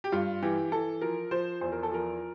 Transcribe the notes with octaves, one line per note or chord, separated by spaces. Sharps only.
G4
G2 F4
E3 G4
E3 A4
F3 A#4
F3 C5
E2 C5
A#4
A4
F3 A#4